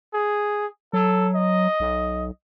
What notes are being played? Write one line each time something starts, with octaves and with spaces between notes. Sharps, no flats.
G#4
F#3 A4
D#5
B1